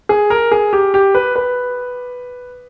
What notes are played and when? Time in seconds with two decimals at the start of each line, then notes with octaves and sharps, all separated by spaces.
0.09 G#4
0.30 A#4
0.52 G#4
0.73 G4
0.94 G4
1.15 B4
1.36 B4